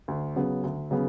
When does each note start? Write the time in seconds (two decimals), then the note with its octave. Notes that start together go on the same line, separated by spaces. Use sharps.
0.08 D2
0.36 C#3 F#3 B3
0.63 D2
0.91 C#3 F#3 B3